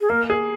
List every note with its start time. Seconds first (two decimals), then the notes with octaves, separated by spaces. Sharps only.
0.01 G#4
0.09 A#3 A#4
0.30 G#4